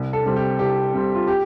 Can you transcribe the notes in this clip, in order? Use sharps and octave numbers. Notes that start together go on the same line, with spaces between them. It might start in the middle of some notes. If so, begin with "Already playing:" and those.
Already playing: C2
A4
C3 G3 C4
G4
C2 G4
C3 G3 C4
F4
G4